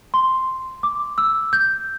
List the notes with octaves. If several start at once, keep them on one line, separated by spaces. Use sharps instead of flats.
C6
D6
E6
G6